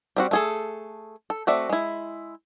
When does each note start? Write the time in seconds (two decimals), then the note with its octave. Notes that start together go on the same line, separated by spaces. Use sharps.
0.16 G3 C4 F#4
0.31 A3 G#4 A4
1.30 A4
1.47 A3 C4 F#4 D5 E5
1.69 G#3 E4